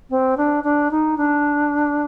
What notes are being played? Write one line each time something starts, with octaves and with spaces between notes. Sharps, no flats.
C4
D4
D4
D#4
D4